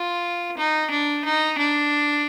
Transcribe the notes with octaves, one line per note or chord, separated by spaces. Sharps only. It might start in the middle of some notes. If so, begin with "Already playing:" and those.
Already playing: F4
D#4
D4
D#4
D4